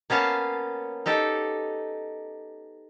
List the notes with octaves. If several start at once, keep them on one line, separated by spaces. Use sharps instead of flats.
A#3 B3 C#4 F5 A5
D#4 G4 A4